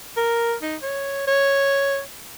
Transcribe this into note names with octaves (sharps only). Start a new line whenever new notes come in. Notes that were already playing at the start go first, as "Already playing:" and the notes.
A#4
D#4
C#5
C#5